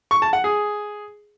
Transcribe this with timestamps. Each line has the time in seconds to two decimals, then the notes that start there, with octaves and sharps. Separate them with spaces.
0.11 C#6
0.22 A5
0.33 F#5
0.44 G#4